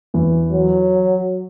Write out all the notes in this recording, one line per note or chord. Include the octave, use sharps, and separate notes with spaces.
E2 E3
F#3